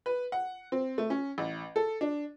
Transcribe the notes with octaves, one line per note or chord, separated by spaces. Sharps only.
B4
F#5
C4
A3
C#4
A1
A4
D4